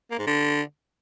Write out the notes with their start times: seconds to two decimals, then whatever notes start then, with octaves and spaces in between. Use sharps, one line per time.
0.11 A#3
0.19 G#2
0.27 D3